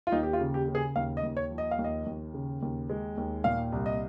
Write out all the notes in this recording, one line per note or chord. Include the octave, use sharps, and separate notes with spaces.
F4
D#2 D#4
G4
F4
C#3
G4
C#3
G#4
D#2 F5
D#5
D#2
C#5
F3
D#5
F5
D#2
D#5
D#2
C#3
D#2
G#3
D#2
A#2 F5
C2
D#5